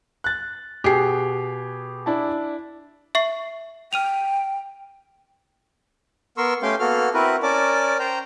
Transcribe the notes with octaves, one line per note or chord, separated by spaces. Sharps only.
F#6 A6
B2 G4 G#4 C7
D4 E4 A5
E5 C#6 C7
G5 F6 D#7 F7
B3 A#4 C6 C#6 E6
A3 C#4 G4 F5 G5 C6
A#3 B3 F#4 A4 F6
C4 E4 F#4 A#4 B4
C#4 A#4 D5 A5 D6
C5 G5 A#5